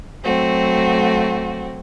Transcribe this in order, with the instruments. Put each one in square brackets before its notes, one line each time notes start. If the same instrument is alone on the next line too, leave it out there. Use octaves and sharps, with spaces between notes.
[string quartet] F#3 A3 C4 F#4